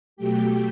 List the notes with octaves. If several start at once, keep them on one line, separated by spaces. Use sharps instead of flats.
B2 F#3 A3 G4 G5